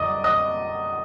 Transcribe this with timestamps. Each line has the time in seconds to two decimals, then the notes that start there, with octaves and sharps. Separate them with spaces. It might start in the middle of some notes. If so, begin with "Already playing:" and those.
Already playing: F#2 D3 G3 D5 D#5 D6 D#6
0.24 D#5 D#6